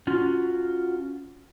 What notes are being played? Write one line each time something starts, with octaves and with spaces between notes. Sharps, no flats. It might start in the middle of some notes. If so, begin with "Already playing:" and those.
C#4 F4 F#4